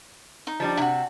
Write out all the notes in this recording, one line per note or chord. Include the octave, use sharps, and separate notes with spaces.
D#4
F3 G3 D4
C3 E4 F#4